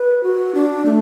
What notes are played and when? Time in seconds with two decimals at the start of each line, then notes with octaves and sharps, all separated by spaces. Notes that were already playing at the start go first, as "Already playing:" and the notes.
Already playing: B4
0.23 F#4
0.55 D4
0.85 A3